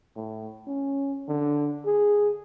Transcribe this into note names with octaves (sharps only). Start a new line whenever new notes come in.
A2
C#4
D3
G#4